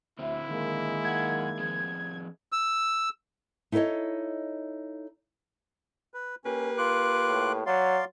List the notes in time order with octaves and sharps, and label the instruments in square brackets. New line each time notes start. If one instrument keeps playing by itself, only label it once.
[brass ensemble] D2 E5 [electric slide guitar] D3 C4 [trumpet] E4
[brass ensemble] D#3 G#3 A#3
[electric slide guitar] F#2 F#5 [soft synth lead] G#6
[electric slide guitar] F3 C4 G#4
[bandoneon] E6
[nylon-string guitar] D#4 E4 A4 A#4 C#5 D#5
[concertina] B4
[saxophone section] A#3 G4 B4 [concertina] C#4
[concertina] F4 D6 F#6
[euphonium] A2
[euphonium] F#3 [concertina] D5 F5 C6